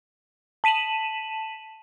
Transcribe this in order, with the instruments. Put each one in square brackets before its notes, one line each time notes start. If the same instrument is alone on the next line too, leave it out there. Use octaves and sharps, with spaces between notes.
[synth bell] A5 B6 D#7 E7 F#7